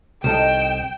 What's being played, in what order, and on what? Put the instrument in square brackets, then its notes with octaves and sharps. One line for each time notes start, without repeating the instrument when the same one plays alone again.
[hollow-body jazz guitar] C2 [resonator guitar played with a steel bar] D#3 A4 D#5 [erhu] G5 [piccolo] E7